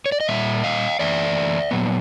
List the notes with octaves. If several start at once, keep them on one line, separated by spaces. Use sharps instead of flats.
C#5
D5
D#5
A#2 G3 E5
D#5 F5
E3 A3 D4 D5 E5
A#2 F#3 B3